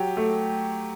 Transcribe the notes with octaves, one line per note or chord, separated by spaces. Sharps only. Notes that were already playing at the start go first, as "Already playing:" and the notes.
Already playing: F#3 G4
A3